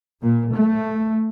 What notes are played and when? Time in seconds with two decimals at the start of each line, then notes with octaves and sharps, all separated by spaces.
0.21 A#2
0.54 A3